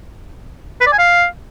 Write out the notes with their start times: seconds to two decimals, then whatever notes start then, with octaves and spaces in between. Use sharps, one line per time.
0.81 B4
0.87 D5
0.92 G#5
0.98 F5